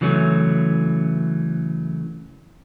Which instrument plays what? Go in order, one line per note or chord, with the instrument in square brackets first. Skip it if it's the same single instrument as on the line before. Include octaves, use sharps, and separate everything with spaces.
[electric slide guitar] C#3 E3 F#3 A3 C#4